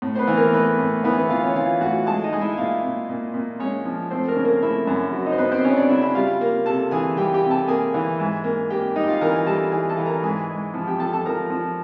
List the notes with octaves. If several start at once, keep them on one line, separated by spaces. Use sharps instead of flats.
A2
C5
B3 B4
E3
A#3 A#4
A3 B3 B4
A2
E3 B3 B4
B3 B4
E3 F4 F5
C#4 C#5
E3 F4 F5
A2 F#4 F#5
G#3 A4 A5
D#4 D#5
G#3
E4 E5
E5
A#2 F4 F5
A#2
A#2
A#2
G#3 C#4 C#5
F3
A3 C4 C5
A#3 A#4
C#3
A#3 A#4
A3 E4 E5
F#2
F#3
D#4 D#5
C5
F#2 B3 B4
C4 C5
C#3 C#4 C#5
D4 D5
C#3 E4 E5
E4 E5
G3 F4 F5
A#3
C3 A4 A5
E3 G#4 G#5
G3 G4 G5
G4 G5
C3
A4 A5
A#3 G#4 G#5
E3
G#2
A#3
A#3 G4 G5
G3 D#4 D#5
F4 F5
E3 A#4 A#5
G#5
G3 A4 A5
E3 G#4 G#5
A4 A5
E3
A#4 A#5
G#2 G#4 G#5
G#3
F3
G4 G5
F3 A4 A5
A4 A5
F3 A#4 A#5
F3